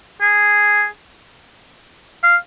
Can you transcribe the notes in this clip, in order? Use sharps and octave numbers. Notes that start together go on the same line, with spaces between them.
G#4
F5